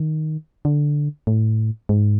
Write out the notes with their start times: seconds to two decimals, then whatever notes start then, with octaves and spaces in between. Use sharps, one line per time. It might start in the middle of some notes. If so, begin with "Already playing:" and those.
Already playing: D#3
0.65 D3
1.27 A2
1.89 G#2